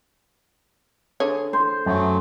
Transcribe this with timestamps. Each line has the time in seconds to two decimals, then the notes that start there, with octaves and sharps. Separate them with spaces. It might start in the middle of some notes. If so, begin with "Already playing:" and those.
1.20 D3 G#4 C#5
1.53 C5
1.86 F#2 F#3 A3